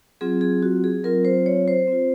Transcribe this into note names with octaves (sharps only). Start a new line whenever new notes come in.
F#3 C4 F4 G#4
G#4
F#4
G#4
F#3 C4 F4 A#4
C5
C#5
C5
C4 F4